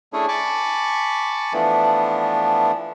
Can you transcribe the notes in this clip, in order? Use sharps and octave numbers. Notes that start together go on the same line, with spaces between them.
A3 C#4 D4 E4 G#4 C#5
G#5 A5 B5 C#6 D6
E3 F3 A3 B3 D4